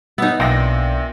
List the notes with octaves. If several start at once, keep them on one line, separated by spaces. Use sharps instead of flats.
B3 D#4 E5
B1 A#2 D4 D5 E5 G5 C6 A#6